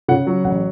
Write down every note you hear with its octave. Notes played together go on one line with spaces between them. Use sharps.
C#3 F#5
F#3
A1 F#5